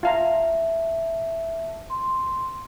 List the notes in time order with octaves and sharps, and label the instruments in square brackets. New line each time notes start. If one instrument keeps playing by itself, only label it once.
[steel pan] F4 F5 A#5 [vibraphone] E5 A5
[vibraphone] C6